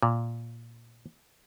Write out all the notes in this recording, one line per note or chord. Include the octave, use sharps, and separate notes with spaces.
A#2